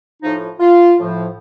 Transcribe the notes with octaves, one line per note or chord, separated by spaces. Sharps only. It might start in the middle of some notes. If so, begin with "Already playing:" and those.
A2 F3 D#4
F4
A2 F3